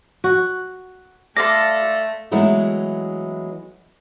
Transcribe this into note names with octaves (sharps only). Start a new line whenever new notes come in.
F#4
A3 A4 D5 F5 C6 A#6
E3 F#3 G#3 A3 B3 E4